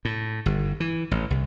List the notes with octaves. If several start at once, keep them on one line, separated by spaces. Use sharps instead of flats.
A2
G1
E3
A1
C2